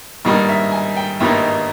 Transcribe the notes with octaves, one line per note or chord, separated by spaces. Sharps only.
G#1 G2 D#3 G3 A#3
E5
G#5
G5
G#1 G2 D#3 G3 A#3 E5